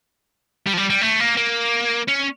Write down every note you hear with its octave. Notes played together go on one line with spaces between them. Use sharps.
G3
F3
G3
G3
A3
A#3
A#3
C#4